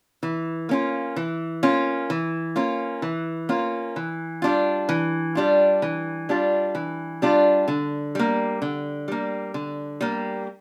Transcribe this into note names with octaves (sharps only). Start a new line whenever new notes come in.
E3
A#3 C#4 F4
E3
A#3 C#4 F4
E3
A#3 C#4 F4
E3
A#3 C#4 F4
E3
G3 D4 F4
E3
G3 D4 F4
E3
G3 D4 F4
E3
G3 D4 F4
D3
G3 A#3
D3
G3 A#3
D3
G3 A#3